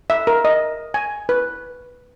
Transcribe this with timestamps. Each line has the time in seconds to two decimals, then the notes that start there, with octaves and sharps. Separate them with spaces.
0.10 E5
0.27 A#4
0.45 D#5
0.94 G#5
1.29 B4